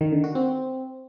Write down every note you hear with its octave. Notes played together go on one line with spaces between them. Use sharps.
D#3
D3
F#4
C4